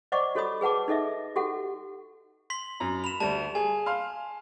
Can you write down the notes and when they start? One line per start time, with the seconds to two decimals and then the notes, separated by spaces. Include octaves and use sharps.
0.12 C5 D5 D#5 F#5 C#6 D6
0.35 F#4 A4 C#5 D#5 B5 D#6
0.61 G#4 B4 F#5 A5 D6
0.88 D#4 A4 D#5 E5
1.36 F#4 G4 A4 F#5
2.50 C6 B6 F#7
2.80 F#2 A#5
3.04 B5 E7 F7
3.20 D2 G3 A5
3.55 G#4 G#5
3.86 F5 C6 F6